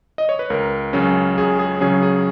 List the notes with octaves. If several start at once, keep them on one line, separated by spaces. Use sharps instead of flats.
D#5
C#5
B4
C#2 A#4
C#3 F#3 C#4
C#2 G#4
G#4
C#3 F#3 C#4 G#4
G#4